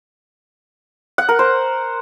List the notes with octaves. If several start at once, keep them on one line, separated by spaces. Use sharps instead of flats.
F#5
A#4
C5